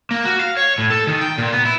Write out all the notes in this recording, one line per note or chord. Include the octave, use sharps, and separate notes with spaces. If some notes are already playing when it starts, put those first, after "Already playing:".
A#3
F#4
F5
C#5
A2
A4
D#3
G5
A#2
B3
E4